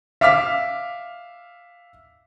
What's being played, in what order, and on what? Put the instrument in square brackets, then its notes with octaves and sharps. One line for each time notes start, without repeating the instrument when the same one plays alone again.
[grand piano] E5 F5 D6 F6 B6